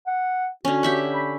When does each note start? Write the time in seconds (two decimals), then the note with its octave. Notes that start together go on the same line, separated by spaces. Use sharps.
0.07 F#5
0.65 D3 C#4 F#4
0.83 G4 E5 F#5
1.14 B5